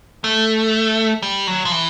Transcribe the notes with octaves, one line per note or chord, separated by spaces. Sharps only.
A3
G3
F#3
F3
E3